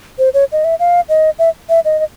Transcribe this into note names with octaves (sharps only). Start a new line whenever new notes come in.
C5
C#5
D#5
E5
F5
D#5
E5
E5
D#5
D#5